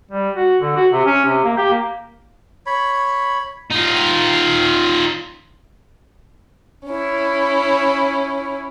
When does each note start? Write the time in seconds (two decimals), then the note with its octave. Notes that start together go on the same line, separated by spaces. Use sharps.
0.12 G3
0.36 F#4
0.61 D3
0.76 F#4
0.92 C3
1.06 C#4
1.25 C3
1.44 A#3
1.57 G4
1.70 A#3
2.66 C#5 B5
3.71 D#4 F4
6.86 C#4 E4